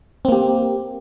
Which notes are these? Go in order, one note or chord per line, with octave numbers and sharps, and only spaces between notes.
A#3 C4 G4